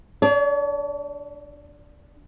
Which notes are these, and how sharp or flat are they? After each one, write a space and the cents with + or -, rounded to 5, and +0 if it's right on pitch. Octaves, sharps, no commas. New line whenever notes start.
D4 +0 C#5 +45